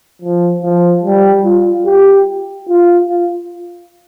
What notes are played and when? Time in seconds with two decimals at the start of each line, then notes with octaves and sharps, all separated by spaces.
0.22 F3
0.62 F3
1.03 G3
1.44 F4
1.86 G4
2.68 F4